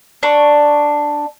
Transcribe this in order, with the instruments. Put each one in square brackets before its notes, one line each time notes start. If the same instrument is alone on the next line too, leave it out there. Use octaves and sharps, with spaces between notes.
[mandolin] D4 C#6